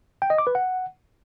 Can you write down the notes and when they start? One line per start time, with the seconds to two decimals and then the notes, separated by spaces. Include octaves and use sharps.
0.22 G5
0.30 D#5
0.38 D6
0.47 B4
0.55 F#5